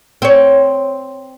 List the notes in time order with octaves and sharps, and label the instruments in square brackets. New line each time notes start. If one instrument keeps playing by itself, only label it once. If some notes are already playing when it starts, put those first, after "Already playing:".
[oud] C4 C#5